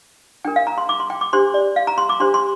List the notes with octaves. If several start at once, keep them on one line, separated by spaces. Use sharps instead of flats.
D4 A#4 G5
F5
A#5
C6
D6
C6
G5
D6
D4 G4 C5 C6
D5
F5
A#5
C6
D6
D4 G4 C5 C6
C6